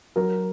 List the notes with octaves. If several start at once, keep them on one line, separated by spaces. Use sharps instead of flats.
F#3 A#4